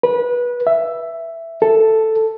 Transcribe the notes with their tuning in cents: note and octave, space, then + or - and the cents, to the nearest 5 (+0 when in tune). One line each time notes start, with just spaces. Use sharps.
B4 -25
E5 +10
A4 +0